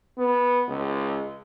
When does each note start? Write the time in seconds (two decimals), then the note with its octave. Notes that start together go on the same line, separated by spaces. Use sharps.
0.17 B3
0.67 C#2